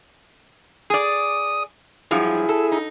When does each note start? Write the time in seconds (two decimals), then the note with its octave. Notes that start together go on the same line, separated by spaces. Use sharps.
0.90 G#4 D5 D#6
2.11 G2 F3 F#3 E4 G#4
2.49 A4
2.72 D#4